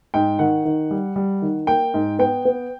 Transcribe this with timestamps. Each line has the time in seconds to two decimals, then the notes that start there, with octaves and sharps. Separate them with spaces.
0.14 G#2 G5
0.39 D#3 F#5
0.65 D#3
0.91 G3
1.16 G3
1.42 D#3
1.67 A#3 G5
1.94 G#2
2.19 B3 G5
2.45 B3